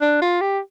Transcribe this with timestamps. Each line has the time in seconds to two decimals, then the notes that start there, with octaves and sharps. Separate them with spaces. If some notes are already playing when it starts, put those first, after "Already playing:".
0.01 D4
0.22 F4
0.41 G4